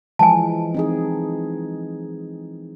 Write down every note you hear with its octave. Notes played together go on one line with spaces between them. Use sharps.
E3 F3 G#3 G#5 A5
C4 D#4 G#4